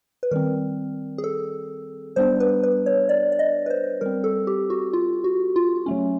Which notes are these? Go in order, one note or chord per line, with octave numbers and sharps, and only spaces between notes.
B4
D#3 G3 C4 A#4
G#4
A4
G3 B3 D4 C5
B4
B4
C#5
D5
D5
D#5
B4
C5
G3 C4 A#4
A4
G4
F#4
F4
F#4
F4
F#3 A3 C#4